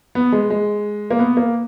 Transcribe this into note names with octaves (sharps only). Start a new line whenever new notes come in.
B3
G#3
G#3
A#3
B3
A#3